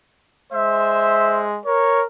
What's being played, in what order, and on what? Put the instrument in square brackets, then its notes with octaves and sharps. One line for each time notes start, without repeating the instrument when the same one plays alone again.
[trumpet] G#3 [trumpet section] C5 E5
[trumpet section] A#4 [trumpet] C#5